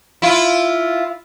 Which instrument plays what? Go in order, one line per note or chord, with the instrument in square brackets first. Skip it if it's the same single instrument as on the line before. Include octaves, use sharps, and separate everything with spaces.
[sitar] E4 F4